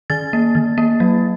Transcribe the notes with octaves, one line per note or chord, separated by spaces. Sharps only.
D#3 A6
A#3
D#3
A#3
F#3